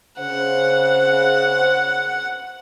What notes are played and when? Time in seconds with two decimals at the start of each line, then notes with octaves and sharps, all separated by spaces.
0.19 C#3 C5 F#5